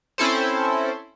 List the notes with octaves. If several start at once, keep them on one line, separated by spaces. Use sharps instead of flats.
C4 C#4 E4 A4 C5